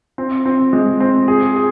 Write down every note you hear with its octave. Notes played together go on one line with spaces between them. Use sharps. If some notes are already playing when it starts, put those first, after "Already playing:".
C4
C4
G#3
C4
G#4
G#4